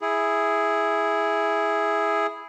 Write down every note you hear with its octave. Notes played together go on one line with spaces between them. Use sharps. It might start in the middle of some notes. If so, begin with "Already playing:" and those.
E4 G#4